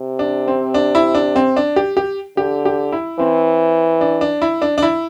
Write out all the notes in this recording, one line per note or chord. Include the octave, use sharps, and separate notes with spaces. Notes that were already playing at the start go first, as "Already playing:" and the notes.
Already playing: C3
D4
C4
D4
E4
D4
C4
D4
G4
G4
D3 G4
G4
E4
E3 C4
D4
D4
E4
D4
D4
E4